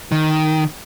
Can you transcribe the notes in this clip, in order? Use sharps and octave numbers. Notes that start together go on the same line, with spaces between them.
D#3